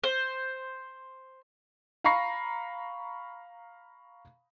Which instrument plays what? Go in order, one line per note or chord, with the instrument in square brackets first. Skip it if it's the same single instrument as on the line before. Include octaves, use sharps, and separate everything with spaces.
[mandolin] C5
[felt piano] F5 A#5 B5 C#6 A#6 C7